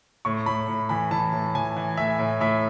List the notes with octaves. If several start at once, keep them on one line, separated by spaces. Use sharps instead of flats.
A2 C#6
A2 B5
A2
E3 B5
E3 A5
A2
E3 G#5
E3
A2 E5
A2
A2 E5